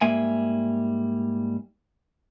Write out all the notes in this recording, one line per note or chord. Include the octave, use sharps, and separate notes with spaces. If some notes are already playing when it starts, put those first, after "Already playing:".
G#2 G3 A#3 E5 G#5